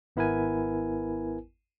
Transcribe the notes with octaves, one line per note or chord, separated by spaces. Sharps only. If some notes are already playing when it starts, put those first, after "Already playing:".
G#1 B3 E4 A#4 B4 G#5